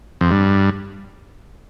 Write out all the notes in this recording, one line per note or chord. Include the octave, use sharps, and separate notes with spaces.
F2
G2